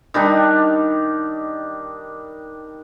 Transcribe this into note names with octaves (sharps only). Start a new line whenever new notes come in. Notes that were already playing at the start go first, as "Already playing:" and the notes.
D#3 G3 D4 D#4